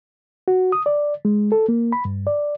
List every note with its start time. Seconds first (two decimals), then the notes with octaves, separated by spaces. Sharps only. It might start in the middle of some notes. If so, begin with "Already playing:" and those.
0.48 F#4
0.72 D#6
0.86 D5
1.25 G#3
1.52 A4
1.69 A#3
1.92 B5
2.05 G2
2.27 D5